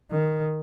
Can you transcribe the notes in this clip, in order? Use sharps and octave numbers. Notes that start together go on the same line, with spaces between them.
D#3